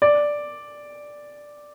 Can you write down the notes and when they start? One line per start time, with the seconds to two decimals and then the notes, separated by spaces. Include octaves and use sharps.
0.02 D5